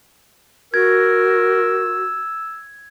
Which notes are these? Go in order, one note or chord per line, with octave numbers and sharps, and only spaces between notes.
F#4 A#4 E6 G#6